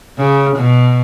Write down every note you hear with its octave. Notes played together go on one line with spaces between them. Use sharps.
C#3
B2